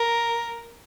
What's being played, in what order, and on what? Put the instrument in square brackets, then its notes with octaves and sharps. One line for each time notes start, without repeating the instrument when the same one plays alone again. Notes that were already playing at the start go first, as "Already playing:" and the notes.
Already playing: [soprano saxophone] A#4